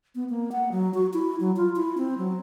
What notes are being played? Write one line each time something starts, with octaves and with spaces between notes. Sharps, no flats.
B3
A#3
F#5
F#3
F#4
E4
F#3
F4
E4
C4
F#3